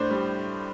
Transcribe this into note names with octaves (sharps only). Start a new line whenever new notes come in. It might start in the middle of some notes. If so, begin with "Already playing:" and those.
Already playing: A2 D4 C5
G3